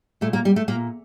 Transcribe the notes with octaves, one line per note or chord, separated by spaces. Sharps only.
A#2 A3
A#3
G3
A3
A#2 A#3